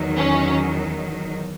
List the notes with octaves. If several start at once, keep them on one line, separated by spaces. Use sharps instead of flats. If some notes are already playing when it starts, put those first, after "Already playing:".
Already playing: E2 D#3 F#3
C#4